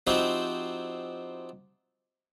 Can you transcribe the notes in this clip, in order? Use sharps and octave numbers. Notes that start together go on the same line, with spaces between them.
F3 C4 D#4 E4 F#4 G4